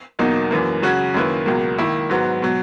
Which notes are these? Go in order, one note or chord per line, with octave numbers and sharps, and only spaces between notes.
E2 B2 F#3 A#3 D#4
F#2 E3 A#3
C#3 F#3 C#4 F#4
F#2 D#3 A#3 E4 B4
C#2 B2 F#3 A#3
D#3 A#3 E4
G#2 F#3 B3
B2 F#3